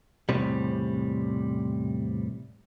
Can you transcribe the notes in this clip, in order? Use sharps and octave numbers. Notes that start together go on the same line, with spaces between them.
E2 A2 C3 G3